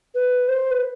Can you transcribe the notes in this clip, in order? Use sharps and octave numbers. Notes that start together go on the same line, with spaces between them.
B4
C5
B4